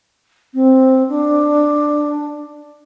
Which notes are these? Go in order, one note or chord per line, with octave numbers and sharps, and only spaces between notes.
C4
D4